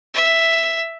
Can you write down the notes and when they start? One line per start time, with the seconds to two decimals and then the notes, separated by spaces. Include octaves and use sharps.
0.14 E5